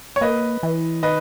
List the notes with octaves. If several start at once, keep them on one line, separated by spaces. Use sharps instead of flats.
C#5
A#3 B4 D#5
E3
D#3 B4 D#5